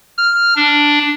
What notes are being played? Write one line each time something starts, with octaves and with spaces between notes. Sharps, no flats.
F6
D4